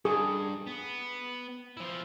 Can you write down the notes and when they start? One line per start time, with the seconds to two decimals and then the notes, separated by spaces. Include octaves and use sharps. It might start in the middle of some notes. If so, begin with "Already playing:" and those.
0.05 G2 G#4
0.67 B3
1.77 F3 E4